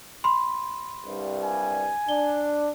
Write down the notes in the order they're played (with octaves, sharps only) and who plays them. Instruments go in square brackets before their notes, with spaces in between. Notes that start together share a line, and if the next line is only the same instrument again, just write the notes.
[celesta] B5 C6
[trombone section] C2 G2 G3
[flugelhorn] G#5
[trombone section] D4 [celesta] G7